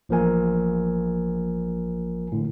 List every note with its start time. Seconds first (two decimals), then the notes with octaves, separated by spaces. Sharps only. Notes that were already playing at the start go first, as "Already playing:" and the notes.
0.09 A1 F3 A#3 A#4 G#5
2.32 A2 D3